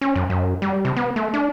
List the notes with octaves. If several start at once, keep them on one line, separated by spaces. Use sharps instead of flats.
C#4
F#2
F#2
G3
C3
B3
A3
D4